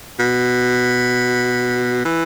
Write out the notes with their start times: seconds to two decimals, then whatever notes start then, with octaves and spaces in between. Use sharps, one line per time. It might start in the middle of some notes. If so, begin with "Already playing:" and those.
0.19 B2
2.05 E3